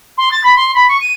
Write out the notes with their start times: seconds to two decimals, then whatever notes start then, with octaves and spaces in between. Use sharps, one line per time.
0.18 C6
0.31 A6
0.44 B5
0.56 C6
0.74 B5
0.88 C#6
1.01 D#7